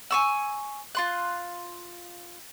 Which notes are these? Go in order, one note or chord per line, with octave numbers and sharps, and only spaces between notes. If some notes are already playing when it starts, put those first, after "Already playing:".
G#5 C#6 E6
F4 C6 F#6